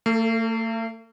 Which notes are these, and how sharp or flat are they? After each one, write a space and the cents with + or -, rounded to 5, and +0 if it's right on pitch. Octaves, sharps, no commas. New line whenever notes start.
A3 +45 A4 +0